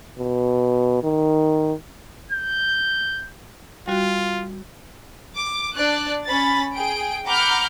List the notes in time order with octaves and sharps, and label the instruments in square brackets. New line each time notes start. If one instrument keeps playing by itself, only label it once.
[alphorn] B2
D#3
[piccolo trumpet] G6
[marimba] G3 F#4 [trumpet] F4
[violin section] D6
D4 D5 F#6
C#4 B5 A6
G#4 G5 D7
F#5 A#5 B5 D6 F6 G6